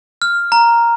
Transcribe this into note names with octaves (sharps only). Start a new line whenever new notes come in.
F6
A#5